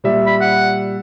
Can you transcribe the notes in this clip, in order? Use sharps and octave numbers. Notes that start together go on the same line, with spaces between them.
A#2 G3 E5
B5
F#5